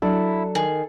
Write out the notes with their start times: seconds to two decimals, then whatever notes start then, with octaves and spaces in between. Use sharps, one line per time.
0.02 F#3 D4 E4 A4
0.55 D#3 G#4